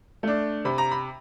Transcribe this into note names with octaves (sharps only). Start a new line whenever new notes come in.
A3 D4
C3 B5
A#5
B5